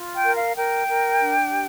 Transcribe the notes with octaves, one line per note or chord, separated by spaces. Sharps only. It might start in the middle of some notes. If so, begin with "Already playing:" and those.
Already playing: F4
G5
A#4
F5
A#4 G5
A#4
D4
G4